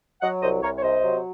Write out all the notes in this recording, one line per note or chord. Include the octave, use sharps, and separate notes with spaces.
F#3 D#5 F#5
C2 C5 D#5
C2 A#4 C#5
C#5
C3 C5 D#5
F#3